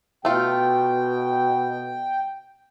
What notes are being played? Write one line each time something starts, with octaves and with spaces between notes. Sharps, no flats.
B2 A3 F4 G5